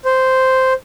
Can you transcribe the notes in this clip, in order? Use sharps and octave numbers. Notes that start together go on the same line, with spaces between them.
C5